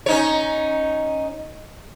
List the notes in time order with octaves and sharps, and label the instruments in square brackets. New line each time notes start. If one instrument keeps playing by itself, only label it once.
[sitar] C#4 D#4 C#5